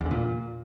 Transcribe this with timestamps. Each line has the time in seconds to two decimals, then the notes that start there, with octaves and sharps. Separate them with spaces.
0.01 E2
0.06 D3
0.11 A#2